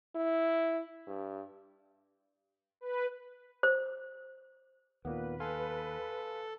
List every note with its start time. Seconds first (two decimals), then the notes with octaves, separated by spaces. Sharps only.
0.16 E4
1.08 G2
2.81 B4
3.63 C5
5.05 D#2 A#2 A#3 B3 B4
5.40 A4 F5 G#5 C6